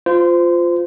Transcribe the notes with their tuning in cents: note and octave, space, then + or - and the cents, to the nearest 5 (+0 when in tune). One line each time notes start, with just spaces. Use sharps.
F4 +0 C5 -25